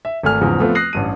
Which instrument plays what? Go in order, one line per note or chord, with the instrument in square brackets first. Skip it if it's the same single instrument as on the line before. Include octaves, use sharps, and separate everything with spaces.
[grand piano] E5
G#1 A3 G#5 F6
E2 G#2 C#3 F3
F3 A3 B3 C4 F4
D#6 F#6 A#6 C7
A1 G2 D#7